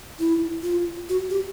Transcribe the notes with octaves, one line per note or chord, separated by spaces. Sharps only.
E4
F4
F#4
G4